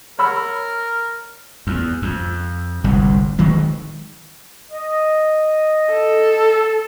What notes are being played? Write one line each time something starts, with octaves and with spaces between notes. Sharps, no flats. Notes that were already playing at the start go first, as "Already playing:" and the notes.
A#4 C#5 B5 E6
E2
F2
G1 C2 G#2
D#3 F#3 G#3
D#5
A4